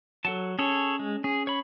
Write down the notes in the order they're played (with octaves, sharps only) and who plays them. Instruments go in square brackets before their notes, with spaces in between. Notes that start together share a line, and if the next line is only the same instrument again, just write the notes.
[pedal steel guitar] F#3 [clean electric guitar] A4 F#5 A5
[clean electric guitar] C#4 [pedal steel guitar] G#4 A4 C#5
[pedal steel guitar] G#3
[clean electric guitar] C#4 [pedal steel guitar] G#4
[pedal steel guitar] C#5 B5